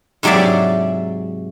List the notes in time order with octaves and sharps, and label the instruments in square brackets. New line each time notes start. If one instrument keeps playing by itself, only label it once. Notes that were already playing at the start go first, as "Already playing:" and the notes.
[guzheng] G#2 C3 F#3 G#4 D5 E5